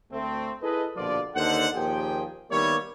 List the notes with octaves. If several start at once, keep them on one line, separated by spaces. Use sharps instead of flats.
D2 A3 C4
E4 G#4 A4 B4 D#5
A#1 B2 D3 F3 F4 D5
D#2 D3 D#4 A4 C5 F#5
D#2 A#2 F3 G4 G#4 G5
D#3 G3 A#3 B3 E4 C#5